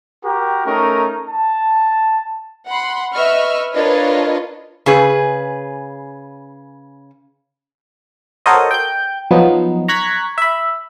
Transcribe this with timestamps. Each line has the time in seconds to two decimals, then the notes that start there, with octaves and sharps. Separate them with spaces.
0.25 F#4 G4 A#4
0.66 A3 C#4 D#4 A#4
1.29 A5
2.67 F#5 B5 C6
3.13 B4 D#5 E5 B5 C#6 F6
3.73 D4 F4 A#4 B4 C#5 D#5
4.86 C#3 G#4 B4
8.46 F#4 A4 A#4 C5 C#5 D#5
8.71 G5 G6
9.31 F3 F#3 B3 D#4
9.88 A#5 C#6 F#6 G#6 A#6 B6
10.38 E5 B5